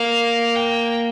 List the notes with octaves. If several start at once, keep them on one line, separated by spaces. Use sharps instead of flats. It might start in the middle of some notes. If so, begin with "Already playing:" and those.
Already playing: A#3 F5
G5